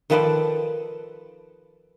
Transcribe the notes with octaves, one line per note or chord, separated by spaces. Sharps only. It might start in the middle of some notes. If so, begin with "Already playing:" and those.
D#3 F3 A4 B4 C5 D5